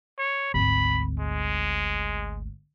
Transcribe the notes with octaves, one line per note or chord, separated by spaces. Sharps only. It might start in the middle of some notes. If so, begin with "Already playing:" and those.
C#5
G#1 D2 B5
G#3